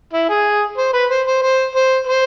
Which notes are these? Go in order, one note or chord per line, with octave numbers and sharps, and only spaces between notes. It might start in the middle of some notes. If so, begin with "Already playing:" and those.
E4
G#4
C5
B4
C5
C5
C5
C5
C5